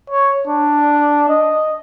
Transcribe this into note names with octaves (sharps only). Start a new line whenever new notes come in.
C#5
D4
D#5